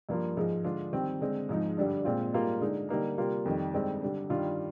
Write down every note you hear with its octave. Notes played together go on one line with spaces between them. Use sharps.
G2 F3 A#3 F4
G#2 F3 G#3
D3 G#3 D4 F4
D#3 G3 C4
D3 G#3 C4
G#2 F3 G#3 D#4
G2 D3 G3 D4
A#2 G#3 C4 F4
G#2 G3 A#3 F4
D3 G#3 D#4
D3 G3 A#3 D#4
C3 G3 A#3 F4
F2 D#3 G3
G2 D#3 G#3 C4
D3 G3 D4
G2 D#3 G3 D4 F4